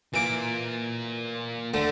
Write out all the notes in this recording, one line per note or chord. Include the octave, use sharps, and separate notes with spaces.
A#2 E3 A#3 D6
D2 D3 A3